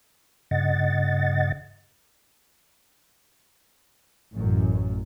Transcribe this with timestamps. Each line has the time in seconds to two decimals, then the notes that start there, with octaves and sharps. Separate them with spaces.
0.51 G2 C#3 D#5 F#5 A6
4.33 A1 F#2